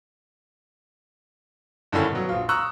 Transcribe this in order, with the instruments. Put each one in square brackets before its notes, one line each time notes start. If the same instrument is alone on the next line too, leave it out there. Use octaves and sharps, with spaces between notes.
[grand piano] G2 D3 D#3 F3 C#4 E4
B2 F#3
A#1 F4
A#5 C#6 D#6 E6 F#6